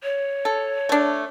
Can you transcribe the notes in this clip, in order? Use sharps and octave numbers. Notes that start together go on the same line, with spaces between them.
C#5
A4
A3 D4